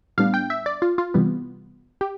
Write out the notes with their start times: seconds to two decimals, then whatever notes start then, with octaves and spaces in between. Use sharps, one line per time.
0.18 A2 G3 B3 D4 F5
0.34 G5
0.50 E5
0.66 D5
0.82 F4
0.98 F4
1.14 C3 E3 G3 B3
2.01 G4